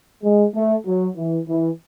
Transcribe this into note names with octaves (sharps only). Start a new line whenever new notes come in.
G#3
A3
F#3
E3
E3